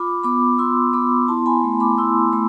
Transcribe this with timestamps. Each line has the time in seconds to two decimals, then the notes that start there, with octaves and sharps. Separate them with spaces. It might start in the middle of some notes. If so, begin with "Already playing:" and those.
Already playing: F4 B5 D6
0.23 B3 B5 D6
0.58 F4 C6 E6
0.93 B3 B5 D6
1.28 E4 A5 C6
1.46 G#5 B5
1.64 A3
1.80 B5 D6
1.98 E4 C6 E6
2.33 A3 B5